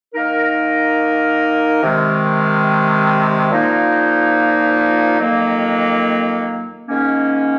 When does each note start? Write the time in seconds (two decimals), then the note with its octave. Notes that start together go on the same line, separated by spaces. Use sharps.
0.14 D#3 A#3 D#4 A#4
1.83 C3 D#3 G#3
3.51 A#2 F3 A#3 D#4
5.20 F2 D#3 F#3 A#3
6.88 G#2 D#3 A#3 C#4